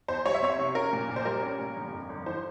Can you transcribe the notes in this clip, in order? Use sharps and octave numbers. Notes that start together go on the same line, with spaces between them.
E2 C5
G3 C#5
E5
C4 C#5
C3
C#4 A#4
A#2
A#1
C5
G3 A#4
C#4
A#2
G1
F2
G1
E3 C5